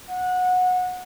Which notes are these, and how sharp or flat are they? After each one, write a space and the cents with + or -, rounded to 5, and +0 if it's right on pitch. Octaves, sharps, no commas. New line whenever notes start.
F#5 -20